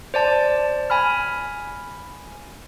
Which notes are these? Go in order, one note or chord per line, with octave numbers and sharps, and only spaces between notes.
C5 D5 A5
G#5 B5 F6